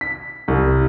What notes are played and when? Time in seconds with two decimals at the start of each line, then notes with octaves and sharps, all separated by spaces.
0.01 B6
0.48 C2